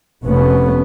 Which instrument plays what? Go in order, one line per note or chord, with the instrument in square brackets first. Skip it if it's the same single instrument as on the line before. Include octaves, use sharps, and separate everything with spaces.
[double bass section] F1 C3 A3 B3 C#4